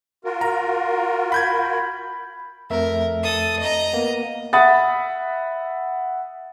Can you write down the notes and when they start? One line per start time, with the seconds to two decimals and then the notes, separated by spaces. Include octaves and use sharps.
0.24 F4 F#4 A#4
0.41 A#5
1.32 B5 G6 G#6
2.70 F2 A3 A#4 E5
3.23 A4 D#6
3.59 D#5 A#5
3.93 A#3 B3
4.53 E5 F#5 B5 D#6 A6